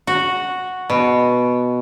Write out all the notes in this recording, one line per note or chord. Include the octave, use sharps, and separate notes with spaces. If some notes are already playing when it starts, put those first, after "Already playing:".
F#4
B2